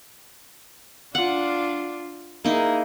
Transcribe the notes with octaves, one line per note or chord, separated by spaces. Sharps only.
D4 F4 F#5
A#3 D#4 E4 G#4